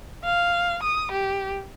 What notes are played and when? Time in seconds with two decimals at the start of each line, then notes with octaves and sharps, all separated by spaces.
0.24 F5
0.82 D#6
1.11 G4